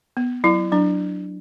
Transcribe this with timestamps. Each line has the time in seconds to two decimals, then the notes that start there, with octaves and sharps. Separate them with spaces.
0.17 B3
0.44 F#3 E4
0.72 F#3 D4